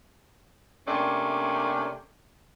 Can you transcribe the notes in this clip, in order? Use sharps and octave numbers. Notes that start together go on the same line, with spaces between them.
C3 A3 A#3 C#4 D4